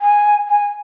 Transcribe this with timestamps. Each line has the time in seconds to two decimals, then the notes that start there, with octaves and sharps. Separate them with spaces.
0.01 G#5
0.49 G#5